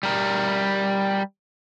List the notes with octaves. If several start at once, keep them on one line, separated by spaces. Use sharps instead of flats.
G3 A#4